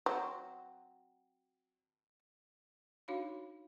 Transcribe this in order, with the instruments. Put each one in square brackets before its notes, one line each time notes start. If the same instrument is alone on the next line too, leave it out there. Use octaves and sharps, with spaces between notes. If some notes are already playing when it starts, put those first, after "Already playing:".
[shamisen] F#3 C4
[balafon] D4 D#4 F#4 C#5 F5 B5